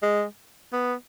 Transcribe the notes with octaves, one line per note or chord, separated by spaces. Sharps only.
G#3
B3